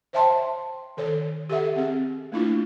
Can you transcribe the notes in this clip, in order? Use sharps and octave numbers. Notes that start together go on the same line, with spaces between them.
C5 C#5 E5 G5 A5 C6
D#3 A4 C#5
G4 A4 E5 F#5
C4 G#4
A3 A#3 D4 E4 F4